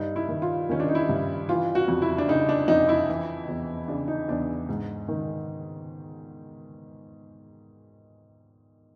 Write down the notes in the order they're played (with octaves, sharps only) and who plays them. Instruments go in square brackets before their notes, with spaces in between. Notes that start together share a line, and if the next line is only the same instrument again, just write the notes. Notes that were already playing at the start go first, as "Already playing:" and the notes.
Already playing: [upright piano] G2 D#4
E4
D#3
F4
D#3 C#4
D4
D#4
E4
G2
E3 F4
F#4
F2
E4
D4
C#3 D#4
D4
F2 D#4
E4
E3
E2
C#3 D4
D#4
E2 D4
G#2
D#3